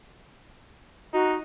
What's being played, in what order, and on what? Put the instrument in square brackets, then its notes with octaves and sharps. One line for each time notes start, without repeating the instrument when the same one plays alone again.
[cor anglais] D#4 [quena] F#4